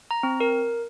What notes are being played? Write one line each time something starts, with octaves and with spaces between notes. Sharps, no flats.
A#5
C4
A#4